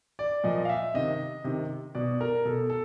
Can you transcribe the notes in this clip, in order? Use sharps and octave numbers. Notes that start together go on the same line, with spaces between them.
D5
A#2 F3 D#5
F5
E5
C3 D#3 D#5
C3 D#3
B2 D5
A#4
B2 A4
A4